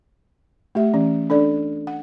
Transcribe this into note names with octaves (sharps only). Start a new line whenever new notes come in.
A3 G4 E5
E3 C#4
D4 A4 D5
F#5